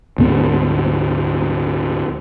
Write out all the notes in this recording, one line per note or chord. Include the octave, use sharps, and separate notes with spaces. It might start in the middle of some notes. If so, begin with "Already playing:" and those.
D2 G#2 B3